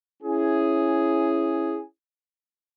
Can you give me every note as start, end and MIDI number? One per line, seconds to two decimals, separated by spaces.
0.23 1.81 61
0.23 1.81 64
0.23 1.81 68